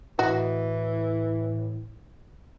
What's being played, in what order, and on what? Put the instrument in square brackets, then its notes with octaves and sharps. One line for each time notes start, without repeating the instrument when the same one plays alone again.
[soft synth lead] A2 [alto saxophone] E3 [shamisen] F#4 D#5